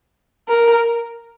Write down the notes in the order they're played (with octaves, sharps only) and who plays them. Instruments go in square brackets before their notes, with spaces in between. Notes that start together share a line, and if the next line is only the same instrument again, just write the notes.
[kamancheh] A#4